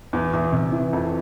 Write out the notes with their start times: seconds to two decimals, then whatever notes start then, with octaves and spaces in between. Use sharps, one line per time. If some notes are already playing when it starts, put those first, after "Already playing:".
0.13 E2
0.33 E2
0.52 C3
0.72 E3
0.93 F2